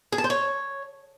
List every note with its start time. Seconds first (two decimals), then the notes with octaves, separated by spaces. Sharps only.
0.12 G#4
0.18 A5
0.24 C5
0.30 C#5